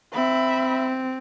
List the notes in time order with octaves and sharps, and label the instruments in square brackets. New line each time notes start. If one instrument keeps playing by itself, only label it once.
[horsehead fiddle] C4 [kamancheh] E5 B5